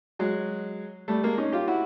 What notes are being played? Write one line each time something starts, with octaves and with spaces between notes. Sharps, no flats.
F#3 G#3
G3 A3
G#3 A#3
C#4 D#4
F4 G4
E4 F#4